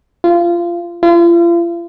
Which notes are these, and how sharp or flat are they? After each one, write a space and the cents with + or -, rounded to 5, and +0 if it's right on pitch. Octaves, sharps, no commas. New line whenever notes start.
F4 -20
F4 -40